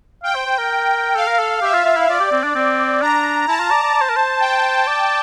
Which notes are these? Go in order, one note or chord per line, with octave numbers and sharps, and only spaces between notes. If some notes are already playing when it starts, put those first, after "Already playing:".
F5 G5
C5
C5
A#4
A4 F5
A#4
A4
G4 E5
F4
F4
E4
F4 D5
G4
C4
D4
C4
D4 A#5
E4 A5
F4
D5
D5
D5
C5
A#4
C5
G5
D5